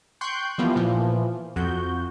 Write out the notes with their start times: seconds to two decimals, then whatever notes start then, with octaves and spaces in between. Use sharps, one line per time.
0.21 G5 C6 C#6 F#6 G6
0.58 E3 F3 G3 A#3 B3 F4
0.76 A#2 E3 F3
1.56 F2 F#4 G6